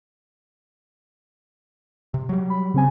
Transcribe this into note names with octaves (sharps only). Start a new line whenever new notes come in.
C3
F#3 G3
B5
C#3 C4 G#5